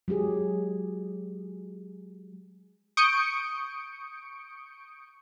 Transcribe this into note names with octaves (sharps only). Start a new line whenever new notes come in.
F#3 G#3 G4 G#4
C#6 D#6 G6 C#7 D7